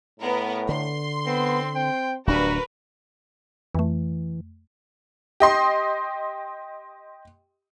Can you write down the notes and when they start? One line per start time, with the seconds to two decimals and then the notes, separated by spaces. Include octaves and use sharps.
0.20 A2 B3 A#4
0.69 D3 C6
1.26 B3 C4
1.75 C4 G5
2.27 D1 G2 D4 F#4 A#4 B4
3.75 F2 E3 A3
5.40 G4 D#5 C6